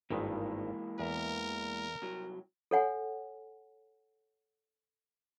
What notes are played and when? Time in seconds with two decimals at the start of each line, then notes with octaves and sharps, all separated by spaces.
0.10 G#1 G2 D#3 E3 G#3 A#3
1.00 E2 A#4 E5 A#5
2.02 C2 F#3
2.71 A4 C#5 F#5 G#5